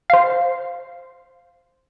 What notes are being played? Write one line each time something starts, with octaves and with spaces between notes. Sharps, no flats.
C5 F5